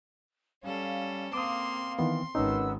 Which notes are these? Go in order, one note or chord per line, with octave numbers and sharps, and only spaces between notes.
G3 C#4 A4 F5
A#3 C4 F5 C6 D6 D#6
D#3 E3 B3 C6
G#1 D#3 C#4 D#4 B4 F#5 E6